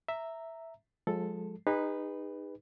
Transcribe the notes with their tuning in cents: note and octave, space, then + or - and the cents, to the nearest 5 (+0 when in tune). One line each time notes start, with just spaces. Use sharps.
E5 +0 A#5 -15
F3 +40 G#3 +0 A4 +0
D#4 -15 G#4 -45 B4 +0